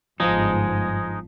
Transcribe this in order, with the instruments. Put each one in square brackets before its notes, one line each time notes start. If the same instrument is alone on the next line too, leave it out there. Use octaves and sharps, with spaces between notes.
[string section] G1 G#2 [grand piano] F3 [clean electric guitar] G#3 D#4